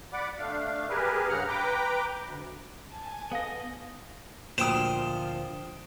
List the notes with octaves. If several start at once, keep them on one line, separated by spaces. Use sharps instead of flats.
D5 F#5 B5 D6
A3 D4 F5
G4 G#4 A#4 B4
G2 C#3 F#5 A#5 F6
B4 G5 A#5 D6
D2
G#5 A5
B3 A4 D#5 F5
D2 A#2 F3 C5 G5 D#6 E7